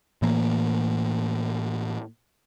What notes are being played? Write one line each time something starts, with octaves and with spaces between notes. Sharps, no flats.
A2 E3 A#3